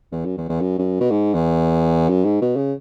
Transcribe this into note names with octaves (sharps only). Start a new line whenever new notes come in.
E2
F#2
E2
E2
F#2
F#2
B2
G#2
E2
F#2
G#2
B2
C#3